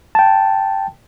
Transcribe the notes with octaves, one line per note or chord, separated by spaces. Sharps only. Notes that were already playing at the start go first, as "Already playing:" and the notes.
G5 A5